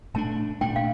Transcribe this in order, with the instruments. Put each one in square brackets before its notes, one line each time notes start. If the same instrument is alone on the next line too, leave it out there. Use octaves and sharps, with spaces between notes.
[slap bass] A#2 A3 D4 [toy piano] A5
[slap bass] A#2 A3 D4 [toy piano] G5
[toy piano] F5